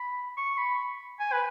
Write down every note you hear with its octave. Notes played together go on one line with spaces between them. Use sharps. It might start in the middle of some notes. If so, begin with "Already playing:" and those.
Already playing: B5
C#6
B5
G#5
B4